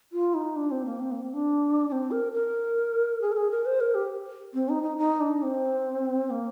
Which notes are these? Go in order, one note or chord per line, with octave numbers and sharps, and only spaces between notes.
F4
D#4
D4
C4
A#3
C4
A#3
C4
D4
D4
C4
A#4
A#4
G#4
A#4
G#4
A#4
C5
A#4
G4
C4
D#4
D#4
D#4
D4
C4
A#3